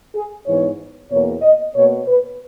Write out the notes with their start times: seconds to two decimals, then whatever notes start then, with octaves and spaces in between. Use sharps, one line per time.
0.14 G#4
0.46 G#2 E3 B3 C#5
1.10 E2 B2 A#3 C#5
1.42 D#5
1.75 B2 A#3 C#5
2.07 B4